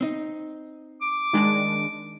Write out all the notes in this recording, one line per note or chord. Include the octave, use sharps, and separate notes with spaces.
C4 D#4
D6
D#3 G#3 D4